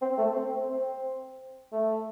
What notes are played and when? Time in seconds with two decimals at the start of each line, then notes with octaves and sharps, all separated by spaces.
0.01 C4
0.18 A3
0.35 C4
0.69 C4
1.72 A3